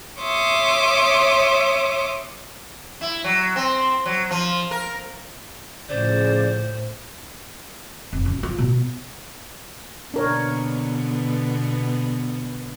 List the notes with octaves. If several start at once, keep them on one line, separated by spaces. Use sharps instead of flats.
C#5 E5 C6 D6 D#6
E4
F#3
C4
F#3
F3
A#4
A2 C#3 F3 C5 D5
F1
C#3
F4
B2
B2 D3 B3 D4 A#4 C#5